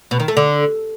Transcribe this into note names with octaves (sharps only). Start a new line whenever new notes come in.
B2
D#3
A3
D3